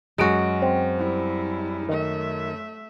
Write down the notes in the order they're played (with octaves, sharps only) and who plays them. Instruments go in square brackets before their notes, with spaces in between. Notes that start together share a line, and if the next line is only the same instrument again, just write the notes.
[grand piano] F#2 D7 [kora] G#3 F#4
[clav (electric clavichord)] C4
[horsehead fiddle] G3 E4
[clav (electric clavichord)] D#3 [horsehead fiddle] A3 E5